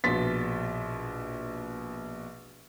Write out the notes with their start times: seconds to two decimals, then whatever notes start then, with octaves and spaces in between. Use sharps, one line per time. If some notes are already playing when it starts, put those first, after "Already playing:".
0.04 A#1 B2 C6 A6 B6